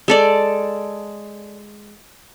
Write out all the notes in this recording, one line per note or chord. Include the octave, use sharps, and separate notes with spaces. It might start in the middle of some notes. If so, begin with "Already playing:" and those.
G#3 A4 D5